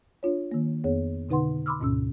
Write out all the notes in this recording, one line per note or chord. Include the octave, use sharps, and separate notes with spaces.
D4 F4 C#5
D#3 A#3
F2 B3 G#4 C#5
B2 D3 D#4 B4 F#5 C6
B5 C6 D6 E6 F6
D2 G#2 B2 C#4 E6